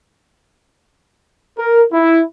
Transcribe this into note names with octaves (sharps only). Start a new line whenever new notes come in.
A#4
E4